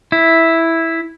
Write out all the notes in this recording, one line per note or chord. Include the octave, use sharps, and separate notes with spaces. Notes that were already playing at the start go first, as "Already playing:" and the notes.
E4